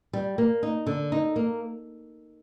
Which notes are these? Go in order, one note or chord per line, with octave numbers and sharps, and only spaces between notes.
G3
A#3
D#4
D3
D#4
A#3